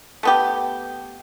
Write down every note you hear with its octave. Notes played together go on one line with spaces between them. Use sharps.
A3 B3 G4